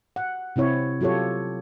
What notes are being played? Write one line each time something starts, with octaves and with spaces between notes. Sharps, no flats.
F#5
C3 C4 E4 C#5
F#3 F4 G4 A4 C#5